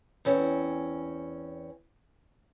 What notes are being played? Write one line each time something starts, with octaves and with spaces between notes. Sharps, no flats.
E2 C4 C#4